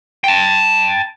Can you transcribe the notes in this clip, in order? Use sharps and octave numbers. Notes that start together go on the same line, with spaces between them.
G5 A5